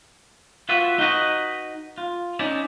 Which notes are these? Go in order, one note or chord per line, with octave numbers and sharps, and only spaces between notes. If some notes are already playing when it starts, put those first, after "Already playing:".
F4 F#4 B4 D5 E5
D#4 F#4 B4 D#5
F4
C#4 D#4 E4 D5